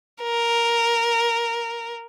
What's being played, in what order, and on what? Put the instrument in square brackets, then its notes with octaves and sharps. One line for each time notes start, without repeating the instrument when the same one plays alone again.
[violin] A#4